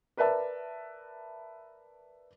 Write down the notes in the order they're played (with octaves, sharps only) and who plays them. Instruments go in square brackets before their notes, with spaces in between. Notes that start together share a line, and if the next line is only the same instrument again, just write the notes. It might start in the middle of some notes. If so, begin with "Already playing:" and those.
[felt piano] A#4 B4 D5 E5 A5